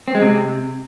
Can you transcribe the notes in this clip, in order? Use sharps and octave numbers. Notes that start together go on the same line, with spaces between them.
C4
G#3
C3